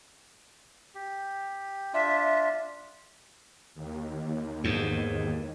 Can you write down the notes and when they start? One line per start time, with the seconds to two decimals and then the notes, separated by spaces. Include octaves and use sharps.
0.95 G4
1.94 D4 F4 E5
3.75 D#2
4.64 E2 G#2